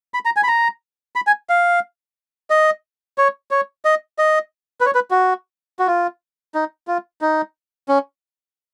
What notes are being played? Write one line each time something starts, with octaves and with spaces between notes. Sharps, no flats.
B5
A#5
G#5
B5
A#5
B5
G#5
F5
D#5
C#5
C#5
D#5
D#5
B4
C#5
B4
F#4
F#4
F4
D#4
F4
D#4
C#4